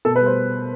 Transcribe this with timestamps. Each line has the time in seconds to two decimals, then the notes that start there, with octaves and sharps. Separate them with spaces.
0.05 B2 A4
0.16 B4
0.21 G3
0.26 C5